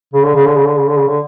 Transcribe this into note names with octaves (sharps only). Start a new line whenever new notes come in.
C#3
D3
C#3
D3
C#3
D3
C#3
D3
C#3
D3